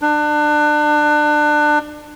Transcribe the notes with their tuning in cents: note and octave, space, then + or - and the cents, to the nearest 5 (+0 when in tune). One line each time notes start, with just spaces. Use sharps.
D4 +25